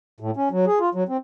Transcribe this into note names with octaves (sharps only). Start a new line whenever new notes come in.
A2
C#4
F#3
G#4
F4
F#3
C4